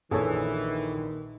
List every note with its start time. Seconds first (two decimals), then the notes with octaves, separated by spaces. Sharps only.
0.11 A#1 D#3 E3 G#4 A4 C#5